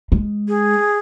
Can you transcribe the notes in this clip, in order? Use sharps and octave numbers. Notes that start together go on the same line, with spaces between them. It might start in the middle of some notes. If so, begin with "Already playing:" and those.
G#3
G#4